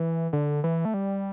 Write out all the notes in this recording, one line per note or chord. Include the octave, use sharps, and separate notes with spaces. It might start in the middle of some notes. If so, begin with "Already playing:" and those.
Already playing: E3
D3
E3
A3
G3